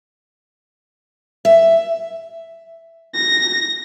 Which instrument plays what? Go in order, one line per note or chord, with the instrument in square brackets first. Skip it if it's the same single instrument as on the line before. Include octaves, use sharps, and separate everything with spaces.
[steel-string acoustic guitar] E5
[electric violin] A#6